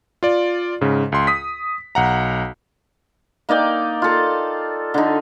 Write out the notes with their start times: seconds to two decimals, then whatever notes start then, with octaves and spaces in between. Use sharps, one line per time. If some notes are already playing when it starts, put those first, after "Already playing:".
0.23 F4 D5
0.81 G#2 C#3
1.12 C#2 C6
1.27 D#6 B6
1.95 B1 F#5 A#5
3.49 A#3 D#4 D5 G5
4.02 F4 A4
4.94 D3 D#4